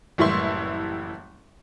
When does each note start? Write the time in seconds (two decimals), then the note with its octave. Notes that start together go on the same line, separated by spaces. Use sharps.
0.18 F#1 A2 E3 G3 E5 C6